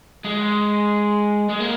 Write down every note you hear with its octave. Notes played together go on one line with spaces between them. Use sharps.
G#3
G#3
A#3